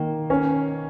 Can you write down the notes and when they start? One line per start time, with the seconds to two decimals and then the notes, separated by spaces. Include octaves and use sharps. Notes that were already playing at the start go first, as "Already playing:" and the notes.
Already playing: D#3 A#3
0.30 C#4